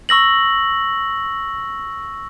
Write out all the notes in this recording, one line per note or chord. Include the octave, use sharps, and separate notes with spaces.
C#6 E6 A#6 F#7